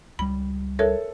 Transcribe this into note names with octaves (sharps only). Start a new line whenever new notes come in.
C#2 G3 B5
A4 A#4 C#5 E5